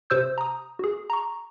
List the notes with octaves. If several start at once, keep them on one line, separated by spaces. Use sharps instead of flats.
C3 C5 E6 G6
A#5 D#6
F#4 G#4
A#5 C#6